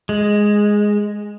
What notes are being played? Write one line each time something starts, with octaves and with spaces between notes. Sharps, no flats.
G#3